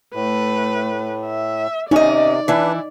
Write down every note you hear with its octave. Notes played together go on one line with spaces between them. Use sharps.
A2 A3 B4
E5
C3 C#4 D#4 D5 D#5
E3 D4 E4 B4